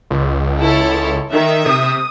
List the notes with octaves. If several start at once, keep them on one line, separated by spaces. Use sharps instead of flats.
C#2
E4 A4 C#5
D#3 E5
C3 D#6